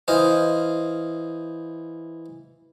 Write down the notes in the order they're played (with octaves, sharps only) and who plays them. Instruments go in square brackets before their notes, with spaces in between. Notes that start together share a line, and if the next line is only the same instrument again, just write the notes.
[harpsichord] E3 C5 D#5 F5